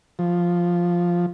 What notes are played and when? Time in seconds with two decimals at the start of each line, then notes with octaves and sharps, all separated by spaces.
0.19 F3